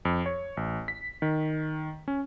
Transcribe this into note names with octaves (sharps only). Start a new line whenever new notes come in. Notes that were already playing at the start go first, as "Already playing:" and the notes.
F2
C#5
A1
B6
D#3
C#4